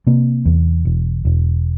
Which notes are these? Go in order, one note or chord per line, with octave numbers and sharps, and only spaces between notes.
C3 A#3
E2
E1
E1